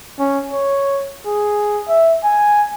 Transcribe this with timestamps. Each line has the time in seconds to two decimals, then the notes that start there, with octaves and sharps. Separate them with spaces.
0.19 C#4
0.51 C#5
1.26 G#4
1.88 E5
2.24 G#5